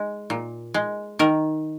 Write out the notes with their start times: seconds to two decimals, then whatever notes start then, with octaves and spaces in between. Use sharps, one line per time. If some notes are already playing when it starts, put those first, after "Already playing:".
Already playing: G#3
0.30 A#2
0.74 G#3
1.19 D#3 A#4